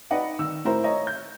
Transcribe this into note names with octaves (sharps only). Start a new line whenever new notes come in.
D#4 B4 D5 D#5 F#5
D#3 E6
A2 E4 A#4 C5 A#5
C#5 D#5 A#5
G6